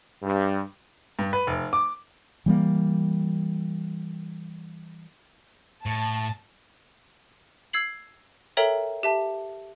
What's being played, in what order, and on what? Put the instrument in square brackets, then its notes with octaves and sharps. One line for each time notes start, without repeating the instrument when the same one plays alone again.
[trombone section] G2
[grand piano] G2
B4
F1
D6
[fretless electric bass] E3 G3 A#3
[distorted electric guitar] A2 [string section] A5
[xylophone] E6 G#6 C7 F#7
A4 A#4 C#5 E5 G5 A#5
G4 E5 A5